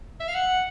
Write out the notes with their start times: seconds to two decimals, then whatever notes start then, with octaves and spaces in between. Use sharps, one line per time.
0.20 E5
0.28 F5
0.35 F#5